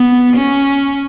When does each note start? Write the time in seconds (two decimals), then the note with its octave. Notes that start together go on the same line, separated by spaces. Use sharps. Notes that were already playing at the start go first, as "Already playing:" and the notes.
Already playing: B3
0.37 C#4